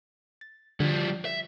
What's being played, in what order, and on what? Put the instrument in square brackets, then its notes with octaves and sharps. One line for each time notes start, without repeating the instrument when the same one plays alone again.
[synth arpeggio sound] A6
[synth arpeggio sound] D3 G#6 [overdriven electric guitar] F3 G3
[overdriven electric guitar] E5